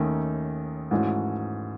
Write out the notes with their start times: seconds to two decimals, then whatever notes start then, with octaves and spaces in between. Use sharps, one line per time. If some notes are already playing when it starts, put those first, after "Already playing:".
Already playing: D#2 D#3 A3 C#4
0.91 G#2 E3 A3 C#4 F#4